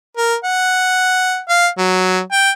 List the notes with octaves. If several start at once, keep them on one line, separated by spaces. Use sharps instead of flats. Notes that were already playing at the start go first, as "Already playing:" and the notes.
A#4
F#5
F5
F#3
G5